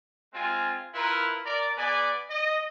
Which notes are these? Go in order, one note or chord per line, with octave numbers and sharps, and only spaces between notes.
G#3 C4 F4 G#5
E4 F4 A#4 B4
A#4 D5
B3 G#4 D5 G#5
D#5